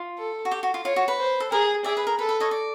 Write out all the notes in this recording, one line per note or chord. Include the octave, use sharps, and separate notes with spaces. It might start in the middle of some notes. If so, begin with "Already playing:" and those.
Already playing: F4
A4
F#4
G4
F#4
F4
F4 C#5
F#4
B4
C5
A4
G#4 A#4
G#4 D5 E5
B4
A#4
A4 B4
B4
C#5 D#5
D5